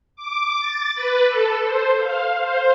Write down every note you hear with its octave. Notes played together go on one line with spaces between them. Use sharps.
D6
A6
B4
A4
C5
F5
C5